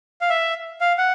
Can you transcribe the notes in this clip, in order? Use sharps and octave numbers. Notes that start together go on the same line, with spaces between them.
F5
E5
F5
F#5